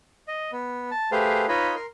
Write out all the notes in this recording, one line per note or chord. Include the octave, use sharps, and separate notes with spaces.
D#5
B3
A5
A3 G4 G#4 B4 C5 F5
D#4 F4 B4 C#5 D#5 B5
A#4 C6